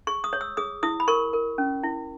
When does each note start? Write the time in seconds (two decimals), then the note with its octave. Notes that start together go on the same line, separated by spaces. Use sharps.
0.07 G#4 C#6
0.24 D#6
0.33 C#5
0.41 E6
0.57 G#4 D#6
0.83 E4 D#6
1.00 B5
1.08 A#4 C#6
1.33 A#4
1.58 C#4
1.83 E4